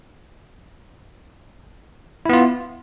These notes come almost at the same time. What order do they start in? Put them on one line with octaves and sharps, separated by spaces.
E4 B3 F4